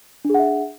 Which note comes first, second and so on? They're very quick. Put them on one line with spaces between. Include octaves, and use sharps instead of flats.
D4 G#4 F#5 E5